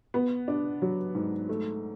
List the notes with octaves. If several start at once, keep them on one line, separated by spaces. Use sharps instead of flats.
B3
D4
F#3
G#2
A3